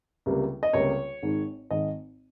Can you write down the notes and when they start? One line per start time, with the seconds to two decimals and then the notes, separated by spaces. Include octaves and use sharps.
0.26 C#2 C3 G3 A#3
0.63 D#5
0.73 C#2 C3 G3 A#3 C#5
1.22 G#1 G#2 D#3
1.70 G#1 G#2 D#3 D#5